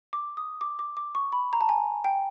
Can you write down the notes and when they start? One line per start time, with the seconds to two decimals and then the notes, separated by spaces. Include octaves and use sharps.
0.13 D6
0.37 D#6
0.61 D6
0.79 D6
0.97 D6
1.15 C#6
1.32 B5
1.53 A#5
1.61 A5
1.69 G#5
2.04 G5